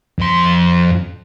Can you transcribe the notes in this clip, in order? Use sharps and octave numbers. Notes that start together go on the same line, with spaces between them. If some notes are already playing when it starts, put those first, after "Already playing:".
F2 C6